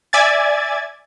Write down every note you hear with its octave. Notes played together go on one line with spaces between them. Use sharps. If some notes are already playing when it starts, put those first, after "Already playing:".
D5 E5 G#5 G#6 A6